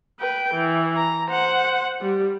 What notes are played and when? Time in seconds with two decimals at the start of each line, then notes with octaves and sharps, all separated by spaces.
0.19 B4 G5
0.54 E3
0.97 A#5
1.30 C5 F#5
2.01 G3